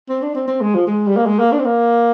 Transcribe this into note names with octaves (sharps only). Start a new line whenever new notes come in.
C4
D4
C4
C4
G#3
F3
G#3
G3
A#3
G#3
A#3
D4
C4
A#3